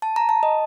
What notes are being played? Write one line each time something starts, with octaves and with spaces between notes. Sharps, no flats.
A5
A#5
A5
D#5